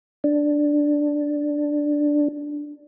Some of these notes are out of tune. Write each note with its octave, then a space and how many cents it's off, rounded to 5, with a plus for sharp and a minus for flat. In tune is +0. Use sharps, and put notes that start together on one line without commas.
D4 +0